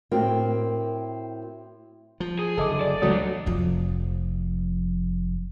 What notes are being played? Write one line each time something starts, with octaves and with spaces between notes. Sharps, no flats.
A2 C4 F#4 A#4 G5
F3
G#4
F#1 D3 A4 D#5 D6
D5
C#2 E3 F#3 G3 A3 D4 D#6
F1 F3